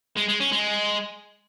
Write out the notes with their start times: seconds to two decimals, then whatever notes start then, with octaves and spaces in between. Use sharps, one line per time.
0.17 G#3
0.29 G#3
0.40 C#4
0.52 G#3